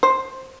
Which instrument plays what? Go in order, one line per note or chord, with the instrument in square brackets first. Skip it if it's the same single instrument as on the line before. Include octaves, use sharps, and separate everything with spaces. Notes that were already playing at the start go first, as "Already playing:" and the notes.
[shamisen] C5